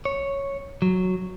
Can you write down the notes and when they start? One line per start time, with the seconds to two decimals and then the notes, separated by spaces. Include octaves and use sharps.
0.05 C#5
0.82 F#3